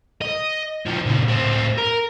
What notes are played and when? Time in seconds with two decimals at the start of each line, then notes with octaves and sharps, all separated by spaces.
0.22 D#5
0.86 D#3 F3
1.06 A#2 C#3
1.28 A2 C4
1.78 A#4